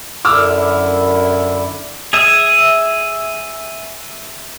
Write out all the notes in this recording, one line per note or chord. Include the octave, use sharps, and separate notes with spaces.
F#2 D3 E4 D6 E6 F6
G#4 E5 G#5